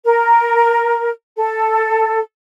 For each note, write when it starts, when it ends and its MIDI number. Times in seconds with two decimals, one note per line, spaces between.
0.05 1.09 70
1.37 2.20 69